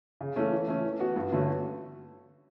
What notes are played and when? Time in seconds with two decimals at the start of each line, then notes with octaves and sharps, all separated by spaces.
0.21 C#3
0.36 E3 A3 C#4
0.52 E3
0.68 A3 C#4
0.85 E3
1.00 B3 F#4
1.16 G2
1.32 D3 A3 C#4 F#4